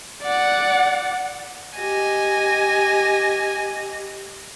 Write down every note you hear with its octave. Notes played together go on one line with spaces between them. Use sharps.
D5 F#5
G4 D#5 G#5 A#6